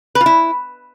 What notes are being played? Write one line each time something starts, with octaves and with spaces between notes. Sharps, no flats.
B4
F4
E4